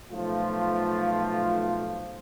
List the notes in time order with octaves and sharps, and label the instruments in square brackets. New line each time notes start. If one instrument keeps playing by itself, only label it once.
[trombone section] B1 F3 A3 [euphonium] F4